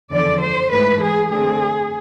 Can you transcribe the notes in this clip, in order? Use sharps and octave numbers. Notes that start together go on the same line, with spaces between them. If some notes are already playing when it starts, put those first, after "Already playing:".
E2 D3 F3 D5
C5
G#2 E3 A3 B4
G#4
D3 A3 C4 G#4